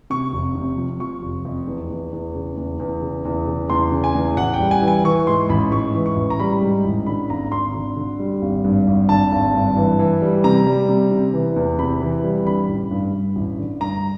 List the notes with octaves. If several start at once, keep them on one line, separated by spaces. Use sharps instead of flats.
C3 C#6
F1
C3
F3
F3 C#6
F1
F2
E2
E2
E2
C#3
E2
E2
C#3
E2
C#3
E2 C6
C#3
G#5
E2
A1 F#5
G5
G3
G#5
E3
G#5
E3 C#6
G#2 C6
A1 B5
G#2 C#6
E3
C#6
A1
A#5
G3 B5
G#2
A1
D3 B5
G#1 A#5
G#1 C6
D3
D3
G3
G#1
G2
G#1
D3 A5
G#1
G2
E3
E3
G3
C3 A#5
G3
C3
C3
E3
E2
C3 B5
E3
G3
D3 B5
A1
G2
G2
A1
D3
G2 A#5